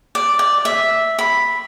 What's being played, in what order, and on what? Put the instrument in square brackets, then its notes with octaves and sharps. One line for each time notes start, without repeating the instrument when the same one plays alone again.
[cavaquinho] D5
D5
E5
B5